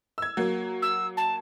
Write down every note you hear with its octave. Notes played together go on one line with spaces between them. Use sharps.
E6 G#6
F#3 A#3
E6
A5